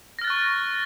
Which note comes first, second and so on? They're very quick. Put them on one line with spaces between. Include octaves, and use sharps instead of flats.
A#6 F6 A6 F#6 C#6